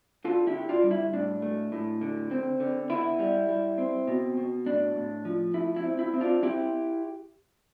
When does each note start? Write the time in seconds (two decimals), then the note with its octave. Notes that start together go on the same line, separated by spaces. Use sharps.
0.24 D3 F4 A4
0.47 E4 G4
0.54 D3
0.69 D4 F4
0.83 G3
0.91 E4
1.13 A2 D4
1.42 A3
1.72 A2
2.01 D3
2.31 C4
2.60 D3
2.90 B3 E4
3.19 G3
3.49 G3
3.78 C4
4.08 B2
4.37 B2
4.66 A2 D4
4.96 A2
5.25 F3
5.54 A3 E4
5.77 E4
5.84 C4
5.99 E4
6.14 C4
6.21 D4 F4
6.43 C4 E4 G4